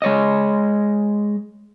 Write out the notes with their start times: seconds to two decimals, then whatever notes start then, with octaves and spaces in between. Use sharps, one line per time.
0.02 G#3 C#5 D#5